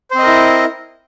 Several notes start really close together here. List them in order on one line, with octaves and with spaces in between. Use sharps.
C5 C4 D#5 A#4 E4